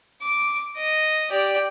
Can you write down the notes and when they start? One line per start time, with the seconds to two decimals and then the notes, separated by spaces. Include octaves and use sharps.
0.22 D6
0.77 D#5
1.30 G4 D5